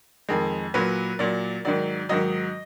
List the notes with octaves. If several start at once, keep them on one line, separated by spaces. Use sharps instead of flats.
F2 D#3 G#3
A#2 F#3 B4
A#2 F#3 D5
G#2 D#3 F#3 D5
G#2 D#3 F#3 D#5